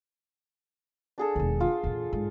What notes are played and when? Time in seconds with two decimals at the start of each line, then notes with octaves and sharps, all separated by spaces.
1.18 D4 G#4 A4
1.36 E1 D#2
1.60 F4
1.84 E2 A#2
2.13 G#2